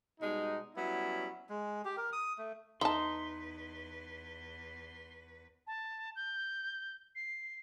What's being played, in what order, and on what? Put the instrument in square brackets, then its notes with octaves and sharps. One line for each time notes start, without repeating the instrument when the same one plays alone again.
[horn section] B2 G3 G#3 D#4
F#3 G3 B3 C#4 E4
[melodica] G#3
G4
A#4
D#6
A3
[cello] E2 B4 [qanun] D#4 [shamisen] E5 A5 [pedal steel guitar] C6
[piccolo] A5
G6
C7